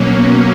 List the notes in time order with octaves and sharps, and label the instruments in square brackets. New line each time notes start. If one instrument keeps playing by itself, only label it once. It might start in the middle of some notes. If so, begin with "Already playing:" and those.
Already playing: [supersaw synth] B2 F#3 A#3 C#4